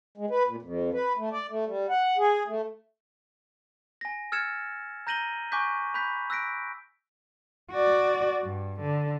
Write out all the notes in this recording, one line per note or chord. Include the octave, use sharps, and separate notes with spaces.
G#3
B4
A#2
F2
B4
A3
D5
A3
G3
F#5
G#4
A3
G#5 A#6
E6 F6 G#6 A6 C#7 E7
A#5 G6 A#6 D#7 F#7 G7
G#5 C#6 D6 F#6 G6 B6
B5 F#6 G6 B6
E6 F#6 A#6 B6 D7
F#4 D5
G2
D3